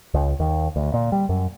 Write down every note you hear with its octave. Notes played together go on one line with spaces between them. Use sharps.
C#2
D#2
D2
A#2
G3
F#2